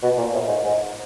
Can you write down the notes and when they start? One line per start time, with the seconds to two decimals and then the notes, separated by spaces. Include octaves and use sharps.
0.02 B2
0.17 A#2
0.33 A2
0.48 G#2
0.62 G#2